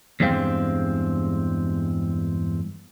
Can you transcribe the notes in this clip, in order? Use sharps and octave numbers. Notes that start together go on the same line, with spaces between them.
E2 G2 G#3 C4 F5 G5